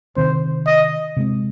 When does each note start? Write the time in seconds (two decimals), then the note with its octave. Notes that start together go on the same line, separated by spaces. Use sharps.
0.16 C3 D#3 C4 C5
0.67 D#5
1.16 C3 G#3 C4